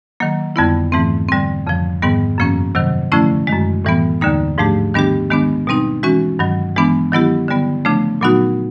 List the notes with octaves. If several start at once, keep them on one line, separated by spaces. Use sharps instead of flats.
D#3 F#3 A#3
F2 D3 G3 B3 E4
G#2 E3 A3 C4
D3 G3 C4
F2 C#3 F3
G#2 D#3 G3 B3
F#2 C#3 F3 A#3 C#4
C3 D#3 F#3
D3 F3 A3 C#4 E4
F#2 D#3 G#3
A2 E3 G3 B3
D#2 D3 G3 A#3 D#4
G#2 F3 A3 D4 G4
D#3 G3 B3 D4 G4
D#3 G#3 B3 D4
B2 G3 C4 D#4
E3 G#3 C#4 F#4
G2 D#3 F#3
E3 G#3 B3 D4
D#3 F#3 B3 E4 G4
D3 G3 B3
C#3 F3 A3 D4
A#2 F#3 B3 D#4 F#4